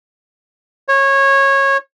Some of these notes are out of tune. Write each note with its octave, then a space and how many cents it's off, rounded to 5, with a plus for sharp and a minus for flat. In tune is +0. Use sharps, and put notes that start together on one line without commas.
C#5 -20